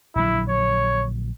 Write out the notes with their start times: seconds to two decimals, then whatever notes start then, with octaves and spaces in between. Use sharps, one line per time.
0.16 A#1 D3 F#3 E4
0.49 C#5